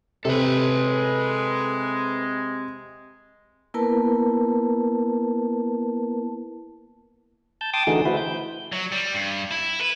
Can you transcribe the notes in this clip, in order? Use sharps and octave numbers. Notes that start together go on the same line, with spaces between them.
C3 G#3 A4 B4
A#3 B3 E4 A#4 B4 A5
A5 G6
G5 A5 C6 D6 D#6
D3 E3 A3 D#4 F#4 G#4
E4 F#4 B4 C5 E5
G6
F#3
G3
G2
E4
B4